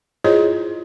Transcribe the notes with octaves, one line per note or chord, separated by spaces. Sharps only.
E4 F4 G#4 C5 C#5 D#5